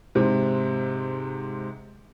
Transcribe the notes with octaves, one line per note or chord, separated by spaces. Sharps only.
G#2 C3